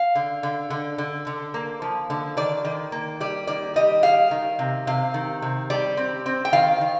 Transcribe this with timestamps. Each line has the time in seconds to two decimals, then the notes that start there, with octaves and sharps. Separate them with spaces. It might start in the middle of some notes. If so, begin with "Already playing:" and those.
Already playing: F5
0.15 D3
0.43 D3
0.70 D3
0.98 D3
1.27 D3
1.54 A#3
1.82 F3
2.10 D3
2.37 D#3 D5
2.65 D#3
2.92 A#3
3.20 G3 D5
3.47 D#3 D5
3.76 G3 D#5
4.03 G3 F5
4.31 D#3
4.59 C3
4.87 C3 F5
5.14 D#3
5.42 C3
5.70 G3 D5
5.97 C4
6.26 C4
6.45 G5
6.53 D#3 F5
6.81 D#3